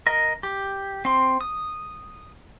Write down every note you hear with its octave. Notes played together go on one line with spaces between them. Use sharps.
A#4 D#5
G4
C4 C6
D#6